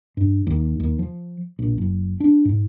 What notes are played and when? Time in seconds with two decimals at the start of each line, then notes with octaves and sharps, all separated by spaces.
0.17 G2
0.47 D#2
0.80 D#2
0.99 F3
1.59 A#1
1.78 F#1
2.20 D4
2.45 G#2